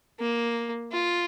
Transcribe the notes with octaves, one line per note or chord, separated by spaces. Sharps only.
A#3
F4